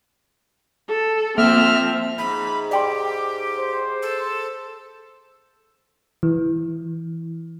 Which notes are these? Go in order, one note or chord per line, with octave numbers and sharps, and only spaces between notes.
A4
F3 A#3 C4 E5 F6
G#2 B5
G4 D5 G5 C6
C5
A4
E3